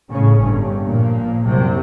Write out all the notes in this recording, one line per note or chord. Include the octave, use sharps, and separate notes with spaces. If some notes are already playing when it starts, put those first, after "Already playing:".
A2 C#3 C#4
G1 G2
A#2 F3 A#3
C2 F#2 C3 F#3 G3